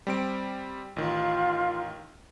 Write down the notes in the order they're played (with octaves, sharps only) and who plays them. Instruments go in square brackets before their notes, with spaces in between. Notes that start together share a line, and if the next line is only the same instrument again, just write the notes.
[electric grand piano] G3 C4 D7
[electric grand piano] A1 D#3 [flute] F4